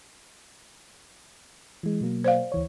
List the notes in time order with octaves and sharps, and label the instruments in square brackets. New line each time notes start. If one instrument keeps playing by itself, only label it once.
[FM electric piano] E3 G#3
B2 F#3 A#3
[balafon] C5 D5 F5
[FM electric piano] D2 E3 C#5